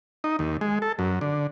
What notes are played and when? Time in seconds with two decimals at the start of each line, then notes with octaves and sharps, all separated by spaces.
0.24 D#4
0.39 D#2
0.61 G#3
0.82 A4
0.99 F#2
1.21 D3